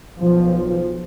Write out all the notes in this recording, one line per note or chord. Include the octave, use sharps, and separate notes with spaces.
B1 F3